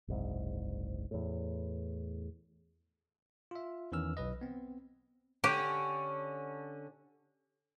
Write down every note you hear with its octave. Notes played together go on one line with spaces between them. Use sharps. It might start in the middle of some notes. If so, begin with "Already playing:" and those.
F#1 C2 G#2
E2 A2
F4 E5
E2 D#3 E3 C#4 E6 F6
B1 B4 D#5
B3 C4
D3 C#4 G4